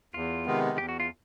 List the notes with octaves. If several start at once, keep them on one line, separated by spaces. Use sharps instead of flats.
E2 F4
C3 D#3 G#3 B3
E2 G4
F#4
F4